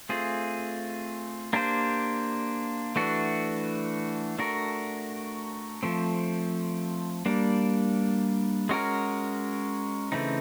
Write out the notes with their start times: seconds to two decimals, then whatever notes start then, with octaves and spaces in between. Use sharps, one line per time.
0.09 A3 C4 F4 G#4
1.53 A#3 D4 G4 C5
2.96 E3 A3 D4 F#4
4.38 A3 D4 F#4 A#4
5.83 F3 A3 C4
7.26 G3 A#3 D4
8.69 G#3 C#4 F#4 A#4
10.12 C#3 E3 A3 C4 D#4